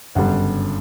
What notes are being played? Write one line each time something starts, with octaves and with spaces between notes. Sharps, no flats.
G1 F#2 C#3 G3 D4 F#5